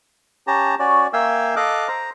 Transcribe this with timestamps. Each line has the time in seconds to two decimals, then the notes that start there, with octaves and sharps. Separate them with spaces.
0.47 C#4 G4 A5 A#5
0.79 C#4 F#4 D5
1.13 A#3 E5 F5 G5 G#5 E6
1.56 A4 D#5 F5 D6 F#6
1.88 C5 A#5